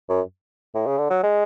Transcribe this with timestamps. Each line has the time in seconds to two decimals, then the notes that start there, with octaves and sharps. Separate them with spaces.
0.10 F#2
0.75 A2
0.87 C#3
0.98 D3
1.10 F#3
1.23 G#3